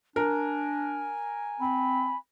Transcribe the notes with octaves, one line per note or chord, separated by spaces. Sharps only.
D4 A#4 G#5
C4 B5